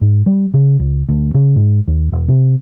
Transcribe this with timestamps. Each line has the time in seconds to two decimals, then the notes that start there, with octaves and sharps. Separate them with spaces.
0.01 G#2
0.26 G3
0.54 C#3
0.79 C#2
1.09 D2
1.34 C#3
1.56 G#2
1.88 D#2
2.12 E1
2.28 C3